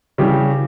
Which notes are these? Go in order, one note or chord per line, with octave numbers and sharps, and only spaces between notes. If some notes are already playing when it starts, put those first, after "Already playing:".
C#3 E3 G3 G4